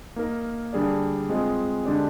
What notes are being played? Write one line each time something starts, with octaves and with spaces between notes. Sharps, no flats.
A#3 D#4 A#4
D3 G3 D4 G#4 D5
G#3 C4 F4 G#4 D#5
D3 G#3 D4 G4 D5